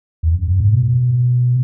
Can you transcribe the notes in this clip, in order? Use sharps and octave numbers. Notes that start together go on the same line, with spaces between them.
E2
F#2
F#2
G#2
B2